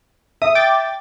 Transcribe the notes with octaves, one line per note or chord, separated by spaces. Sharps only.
E5 D#6
G5 D6 A6